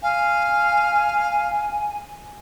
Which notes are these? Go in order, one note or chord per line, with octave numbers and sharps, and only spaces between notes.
F5 G#5